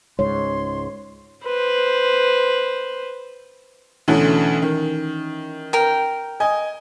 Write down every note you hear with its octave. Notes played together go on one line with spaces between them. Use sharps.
C#2 G#2 C#5 C6
B4 C5
D2 B2 D3 E3 C#4
D#3
A#4 G5
D#5 G#5